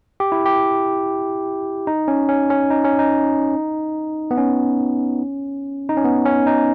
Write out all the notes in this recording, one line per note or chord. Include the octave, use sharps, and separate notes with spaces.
G4
E4
G4
D#4
C#4
C#4
C#4
D#4
C#4
D#4
B3
C#4
D#4
C#4
B3
C#4
D#4